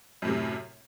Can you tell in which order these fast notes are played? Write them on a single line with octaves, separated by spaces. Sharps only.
F#2 A2 C3